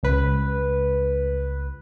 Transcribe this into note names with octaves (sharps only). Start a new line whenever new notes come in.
C#2 B4